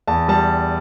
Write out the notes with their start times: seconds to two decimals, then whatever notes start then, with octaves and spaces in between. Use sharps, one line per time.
0.07 E2 A5
0.28 G3 A5